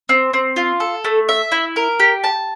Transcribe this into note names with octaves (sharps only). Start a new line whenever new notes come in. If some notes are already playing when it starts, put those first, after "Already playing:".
C4
C4
F4
A4
A3
E5
E4
A#4
G4
A5